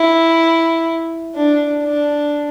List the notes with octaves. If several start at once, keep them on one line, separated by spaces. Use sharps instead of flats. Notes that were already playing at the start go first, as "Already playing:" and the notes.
Already playing: E4
D4
D4